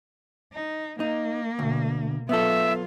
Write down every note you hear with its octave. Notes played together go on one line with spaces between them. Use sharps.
D#4
A#3 D#4
D2 B2 D3
F#3 B3 F4 A4 E5